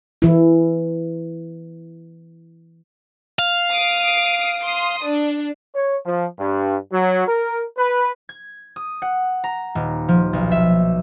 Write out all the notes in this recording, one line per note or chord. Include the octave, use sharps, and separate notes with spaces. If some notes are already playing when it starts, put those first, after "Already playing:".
E3 E4
F5
D#6 C7 D7
C6 D#6
D4
C#5
F3
G2
F#3
A#4
B4
G#6
D#6
F#5
A#5
D#1
F3
B1
E5